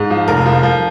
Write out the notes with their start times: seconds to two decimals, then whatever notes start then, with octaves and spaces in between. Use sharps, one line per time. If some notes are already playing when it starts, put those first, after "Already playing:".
Already playing: G#2
0.10 F3
0.28 F1 A#4
0.46 F3
0.63 F3